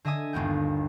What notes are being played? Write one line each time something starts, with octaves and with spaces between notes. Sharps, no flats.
D3 D#5 E5 G#5 D#6
G1 D#2 B3 G5